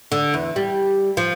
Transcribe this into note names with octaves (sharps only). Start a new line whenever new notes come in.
D3
E2
G3
F3